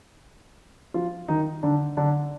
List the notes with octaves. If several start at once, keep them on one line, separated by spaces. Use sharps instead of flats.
F3 F4
D#3 D#4
D3 D4
D3 D4